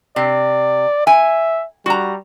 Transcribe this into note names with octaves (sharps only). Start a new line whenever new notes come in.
C3 D5
E5 G#5
G3 F#4 A#5